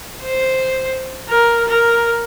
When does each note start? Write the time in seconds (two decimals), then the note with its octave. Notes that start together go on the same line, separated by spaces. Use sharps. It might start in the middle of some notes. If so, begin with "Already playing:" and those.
0.23 C5
1.29 A#4
1.68 A#4